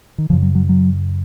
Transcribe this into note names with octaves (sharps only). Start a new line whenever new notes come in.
D#3
F#2 C#3 F3
F#3
F#3
F#3